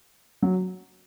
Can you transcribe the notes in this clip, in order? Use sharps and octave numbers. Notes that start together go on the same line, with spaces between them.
F#3